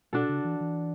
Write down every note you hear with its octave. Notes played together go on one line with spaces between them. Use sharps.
B2 D4 F#4 A4
C#3
E3
E3